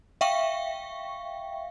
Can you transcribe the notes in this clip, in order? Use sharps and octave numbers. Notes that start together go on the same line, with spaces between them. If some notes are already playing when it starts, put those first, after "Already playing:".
E5 F5 G5 C#6